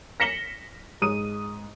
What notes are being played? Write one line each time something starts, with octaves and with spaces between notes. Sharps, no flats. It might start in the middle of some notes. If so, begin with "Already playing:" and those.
A#6 B6 C#7 E7 F#7 G7
G#2 D#6 D#7